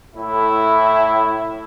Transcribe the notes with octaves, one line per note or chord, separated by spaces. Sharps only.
A2 E4